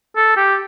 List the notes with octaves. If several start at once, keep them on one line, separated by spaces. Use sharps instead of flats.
A4
G4